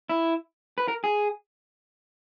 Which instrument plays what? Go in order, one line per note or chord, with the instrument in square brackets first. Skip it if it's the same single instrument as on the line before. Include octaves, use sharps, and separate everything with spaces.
[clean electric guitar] E4
B4
A#4
G#4